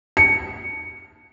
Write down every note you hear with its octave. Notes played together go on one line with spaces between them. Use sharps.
C#7